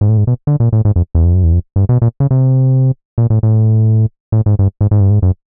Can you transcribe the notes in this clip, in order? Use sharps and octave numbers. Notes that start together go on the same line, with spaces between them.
G#2
A2
G#2
B2
D3
A#2
A2
G#2
F2
E2
F2
F#2
E2
F2
G2
B2
A#2
C#3
C3
A#2
A2
A2
A2
G#2
G2
G#2
G#2
G2
G#2
F#2